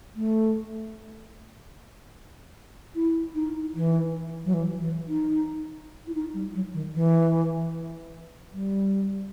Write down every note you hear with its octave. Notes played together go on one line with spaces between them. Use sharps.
A3
E4
D#4
E3
F#3
E3
E3
D#4
E4
D#4
G3
F#3
D#3
E3
G3